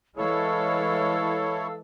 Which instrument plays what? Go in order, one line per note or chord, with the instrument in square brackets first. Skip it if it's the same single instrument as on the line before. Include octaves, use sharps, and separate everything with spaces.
[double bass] E3 G#3 [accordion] E4 C#5 [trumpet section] A4 [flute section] F5 E6